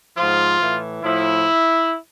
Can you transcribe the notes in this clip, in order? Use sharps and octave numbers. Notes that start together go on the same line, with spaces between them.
G#2 F3 F4
A2 E3
A2 F3 E4